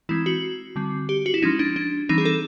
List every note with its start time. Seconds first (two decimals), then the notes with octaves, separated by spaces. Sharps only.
0.09 E3 G#3 C4 E4
0.26 F#4
0.76 D3 G3 C4
1.09 G4
1.26 F#4
1.34 E4
1.42 F3 G#3 C#4 D#4
1.59 D4
1.76 D4
2.09 E3 G3 C4 D#4
2.18 G#4
2.25 A4